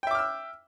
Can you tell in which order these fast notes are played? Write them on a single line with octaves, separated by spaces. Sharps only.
G5 E5 D6 F6 E6